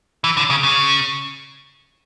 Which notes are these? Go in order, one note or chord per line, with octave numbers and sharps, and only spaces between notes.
E3
D3
C#3
C#3